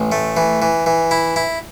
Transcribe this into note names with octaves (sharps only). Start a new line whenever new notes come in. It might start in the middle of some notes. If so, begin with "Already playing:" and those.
Already playing: A1
A3
E3
E3
E3
E4
E4